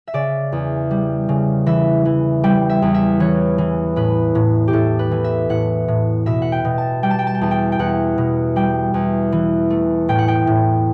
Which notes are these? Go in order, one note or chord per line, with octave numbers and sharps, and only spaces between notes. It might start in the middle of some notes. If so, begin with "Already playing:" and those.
E5
C#3 D5
E2
G3
C#3
E3 E5
E3
G3 G5
E5
E2
E5
E3 C#5
E3
A2 B4
A2
G4
A2 A4
B4
E3
E5
A2 F#5
A2
B2 E5
F#5
G5
B2
A5
G3 G5
A5
G5
A5
G5
E2 A5
G5
G5
E2 F#5
B2
G3 G5
E2
E3
A3
A2 G5
F#5
G5
A2